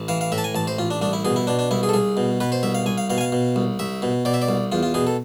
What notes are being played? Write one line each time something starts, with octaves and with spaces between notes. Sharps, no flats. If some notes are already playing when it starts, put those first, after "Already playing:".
Already playing: A1
E3 F5
F5
A2 E5
A5
G#5
A1 A5
C5
A1 F4
D4
C2 D4
E4
B2 G#4
E4
B2 D4
D4
C2 E4
G#4
A4
C2 G#4
B2
B2 B4
C5
C2 E5
F5
C2 G#5
F5
B2 F5
G#5
F5
B2
C2
C2 E5
B2
B2 D5
E5
D5
C2
E2 F4
F4
B2 G#4
A4